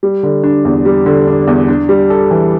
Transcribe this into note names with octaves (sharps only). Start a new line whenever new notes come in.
G3
D3
D4
E2
G3
D3
D4
E2
D4
G3
A4
E3